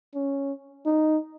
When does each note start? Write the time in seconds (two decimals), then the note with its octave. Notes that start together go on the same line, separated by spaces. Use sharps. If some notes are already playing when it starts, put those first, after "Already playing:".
0.15 C#4
0.86 D#4